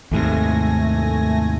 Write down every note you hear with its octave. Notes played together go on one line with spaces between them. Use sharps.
D#2 G#2 C3 A3 G#5 A#6